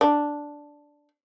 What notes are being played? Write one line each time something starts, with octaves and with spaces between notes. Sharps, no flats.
D4